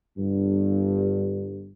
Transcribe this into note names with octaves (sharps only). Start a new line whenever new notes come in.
G1 G2